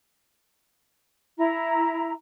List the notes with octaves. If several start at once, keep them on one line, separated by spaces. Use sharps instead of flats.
E4 A#5